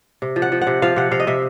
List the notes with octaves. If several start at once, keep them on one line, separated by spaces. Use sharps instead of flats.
C3
F3
F#5
F3
F#5
C3
F3 F5
C3 F#5
C3 F5
D#5
C3 E5